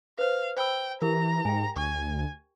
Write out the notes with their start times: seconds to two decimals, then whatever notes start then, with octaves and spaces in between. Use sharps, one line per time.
0.19 B4 C5 F5
0.57 C5 G5 B5 E6
1.02 E3 G4 A#4 A#5
1.45 G#2 G5 G#5
1.76 D2 G#5 C#6